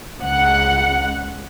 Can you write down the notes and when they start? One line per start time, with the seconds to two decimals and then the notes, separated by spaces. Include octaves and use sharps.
0.20 C#2 F#5